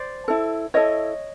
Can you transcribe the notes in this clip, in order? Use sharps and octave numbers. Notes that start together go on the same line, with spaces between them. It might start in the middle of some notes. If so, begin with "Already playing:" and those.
Already playing: C5 D5
E4 A4
E4 A4 C#5 D#5